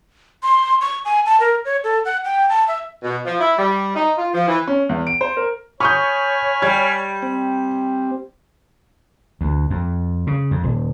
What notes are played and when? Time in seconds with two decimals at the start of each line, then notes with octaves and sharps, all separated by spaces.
0.43 C6
0.81 C#6
1.05 G#5
1.26 A5
1.40 A#4
1.65 C#5
1.84 A4
2.05 F#5
2.25 G5
2.49 A5
2.68 E5
3.03 B2
3.25 F3
3.40 E4
3.59 G3
3.96 D#4
4.18 F4
4.34 F3
4.48 E3
4.67 C#4
4.89 E2
5.07 D7
5.21 C5
5.37 A#4
5.80 C#5 G#5 B5 C#6 D#6 F6 G6
6.62 G3 G#6
7.22 C4
9.41 D2
9.70 F2
10.27 C#3
10.51 F2
10.64 D#1